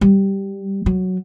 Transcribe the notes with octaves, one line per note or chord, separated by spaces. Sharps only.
G3
F#3